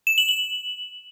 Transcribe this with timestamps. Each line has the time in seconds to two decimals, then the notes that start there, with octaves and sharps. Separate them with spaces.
0.07 E7
0.18 F#7
0.29 F#7